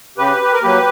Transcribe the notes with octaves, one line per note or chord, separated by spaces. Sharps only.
C#3 G4 B4
G4
A#4
F#3 A#3 G4 B4